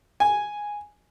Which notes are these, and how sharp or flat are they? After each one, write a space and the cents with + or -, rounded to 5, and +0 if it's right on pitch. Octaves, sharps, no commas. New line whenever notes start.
G#5 -5